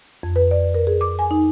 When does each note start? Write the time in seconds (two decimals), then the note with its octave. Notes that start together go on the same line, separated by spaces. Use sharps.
0.23 F2
0.36 B4
0.51 D5
0.74 A#4
0.87 G#4
1.01 D6
1.19 G#5
1.31 D#4